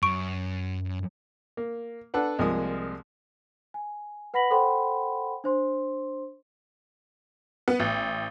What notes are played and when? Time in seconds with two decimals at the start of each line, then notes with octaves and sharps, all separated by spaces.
0.03 F#2 C#6 D7
1.57 A#3
2.14 D4 A4 B4 F#5
2.39 C2 F3 G#3 A#3 D#6
3.74 G#5
4.34 B4 F#5 B5 A#6 B6 F#7
4.51 A4 C5 F#5 G5 B5 C6
5.44 D4 C5 C6
7.68 B3
7.80 A1